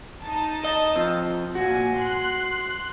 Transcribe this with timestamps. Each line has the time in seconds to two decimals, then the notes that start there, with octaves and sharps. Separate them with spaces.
0.22 D#4 A5
0.64 D#5
0.96 F3 C4
1.55 A#2 F#4 G#5
1.98 C6 F#6